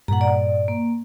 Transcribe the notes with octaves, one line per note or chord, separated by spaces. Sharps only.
G2 A#2 F#5 A#5
D5
A#3